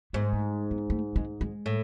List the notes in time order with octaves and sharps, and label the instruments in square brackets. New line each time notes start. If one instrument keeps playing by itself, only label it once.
[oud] G#2 [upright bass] B3
[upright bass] A3
B3
A3
G#3
G#3
[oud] A2